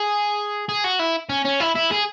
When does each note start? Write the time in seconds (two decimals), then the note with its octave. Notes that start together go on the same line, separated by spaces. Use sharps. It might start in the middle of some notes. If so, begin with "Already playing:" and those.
Already playing: G#4
0.69 G#4
0.84 F#4
0.99 E4
1.30 C#4
1.45 C#4
1.60 E4
1.75 E4
1.91 G#4